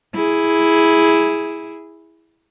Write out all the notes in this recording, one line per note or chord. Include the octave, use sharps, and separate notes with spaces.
E4 G#4